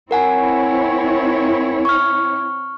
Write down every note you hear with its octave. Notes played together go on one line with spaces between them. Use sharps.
C4 E4 A#4 C#5 F#5 G#5
C#6 F6